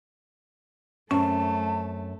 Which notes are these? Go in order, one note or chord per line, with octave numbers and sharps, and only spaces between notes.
F#2 A3 C4 C#4 A5